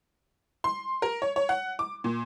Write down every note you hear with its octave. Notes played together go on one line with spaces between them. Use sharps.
C6
A#4
C#5
C#5
F#5
D6
A#2